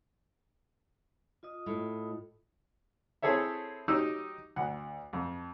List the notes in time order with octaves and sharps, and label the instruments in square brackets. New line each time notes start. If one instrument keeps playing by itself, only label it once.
[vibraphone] F4 D#5 D#6
[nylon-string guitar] A2
[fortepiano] C4 E4 G#4 A4 C#5 E5
F#3 D#4 G4 E6
D2 F#5
F2